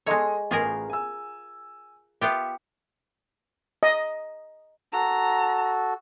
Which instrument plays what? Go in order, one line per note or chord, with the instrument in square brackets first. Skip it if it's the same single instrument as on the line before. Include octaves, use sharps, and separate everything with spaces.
[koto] G#3 C#5 [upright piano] A4 D#5 C6
[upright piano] A1 [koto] F4 G#4 A#4
[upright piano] G#5 E6
[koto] B3 F4 G4 [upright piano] E5
[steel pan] D#5
[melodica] F#4 A4 [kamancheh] A#5